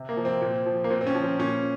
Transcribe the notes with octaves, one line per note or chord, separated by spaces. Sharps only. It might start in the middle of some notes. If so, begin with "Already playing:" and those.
Already playing: C3
A#3
F3
C4
A#2
F3
A#3
A#2 C4
C4
C#4
F3
C4
A#2 C#4